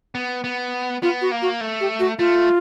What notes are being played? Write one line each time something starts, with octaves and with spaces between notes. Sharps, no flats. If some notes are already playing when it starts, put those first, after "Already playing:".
B3
B3
B3 F4
F#4
A#3
F#4
A3
G4
F#4
A3 F4